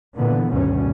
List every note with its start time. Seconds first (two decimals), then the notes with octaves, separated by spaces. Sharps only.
0.17 A#2 D3 E3 B3
0.50 D2 G2 B2 D#3 G3 C#4